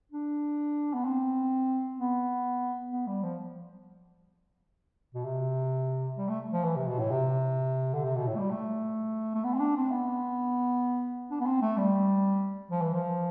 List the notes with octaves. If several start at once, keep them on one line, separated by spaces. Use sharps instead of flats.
D4
B3
C4
B3
B3
G3
F3
B2
C3
G3
A3
F3
E3
C3
B2
A2
C3
D3
C3
B2
A2
A3
G3
A3
A3
B3
C4
D4
C4
B3
D4
B3
C4
A3
G3
F3
E3
F3